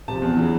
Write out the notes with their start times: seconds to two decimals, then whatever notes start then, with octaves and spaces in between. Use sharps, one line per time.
0.08 C3 F3 A5
0.22 E2
0.37 C#3 E3